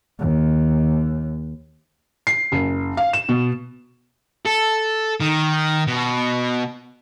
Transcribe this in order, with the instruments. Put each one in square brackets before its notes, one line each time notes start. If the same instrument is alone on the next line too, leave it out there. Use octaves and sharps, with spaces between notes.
[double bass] D#2
[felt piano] C7
F#1
F5
E7
B2
[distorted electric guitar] A4
D#3
B2